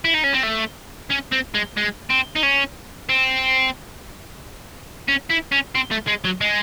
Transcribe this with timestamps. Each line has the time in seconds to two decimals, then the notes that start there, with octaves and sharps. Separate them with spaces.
0.05 E4
0.14 D#4
0.24 C#4
0.34 C4
0.43 A3
1.10 C#4
1.32 C4
1.54 G#3
1.77 G#3
2.10 C4
2.36 D#4
2.43 C#4
3.09 C4
5.08 C#4
5.30 E4
5.52 C#4
5.75 C4
5.91 A3
6.07 G#3
6.25 F#3
6.41 G#3